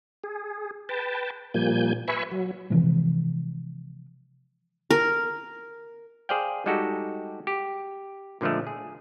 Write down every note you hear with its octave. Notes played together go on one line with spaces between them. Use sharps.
G#4
B4 G5 A5
A#2 F3 G3 A#3 G#5 G6
B4 E5 G#5 B5 C#6
F#3
C3 E3 F3 G#3
A#4
G#4 C5 D5 F5 G5
G3 G#3 D#4 F#4 G4 A4
G4
A#2 D3 F3 G#3 A3
G#4